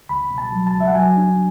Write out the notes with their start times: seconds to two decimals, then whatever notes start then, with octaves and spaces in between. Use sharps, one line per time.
0.09 C#2 B5
0.31 B2
0.38 A5
0.52 F#3
0.67 A5
0.73 C#2
0.80 E5
0.87 F#5
0.95 F#3 G#5
1.17 D4